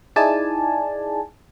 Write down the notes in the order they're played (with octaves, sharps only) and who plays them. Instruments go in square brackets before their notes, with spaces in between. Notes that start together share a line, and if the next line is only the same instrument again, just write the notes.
[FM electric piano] D#4 E4 G#4 D5 G#5 A5